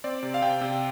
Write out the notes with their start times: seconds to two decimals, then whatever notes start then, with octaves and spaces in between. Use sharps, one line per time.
0.04 C4 D5
0.23 C3
0.34 F5
0.42 C3 G5
0.61 C3